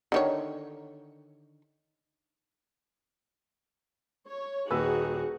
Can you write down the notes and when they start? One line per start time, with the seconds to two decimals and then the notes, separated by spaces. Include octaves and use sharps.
0.12 D3 D#3 C#5
4.28 C#5
4.71 D#1 D#4 F#4 G#4 B4 E6